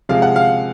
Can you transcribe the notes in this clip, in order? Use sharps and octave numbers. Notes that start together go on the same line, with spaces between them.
C3 F3 G#3 F5
F#5
F5